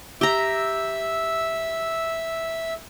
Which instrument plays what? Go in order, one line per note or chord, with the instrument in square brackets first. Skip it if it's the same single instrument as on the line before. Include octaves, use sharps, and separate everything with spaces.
[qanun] G4 A#5 [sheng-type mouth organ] E5 E6